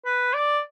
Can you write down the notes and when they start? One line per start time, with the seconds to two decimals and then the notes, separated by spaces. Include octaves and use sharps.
0.05 B4
0.34 D5